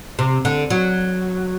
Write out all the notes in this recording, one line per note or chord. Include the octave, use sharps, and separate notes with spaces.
C3
D3
F#3